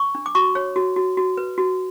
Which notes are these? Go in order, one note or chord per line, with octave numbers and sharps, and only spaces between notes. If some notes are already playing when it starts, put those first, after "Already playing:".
Already playing: C#6
D4
D6
F#4 C#6
C#5
F#4
F#4
F#4
B4
F#4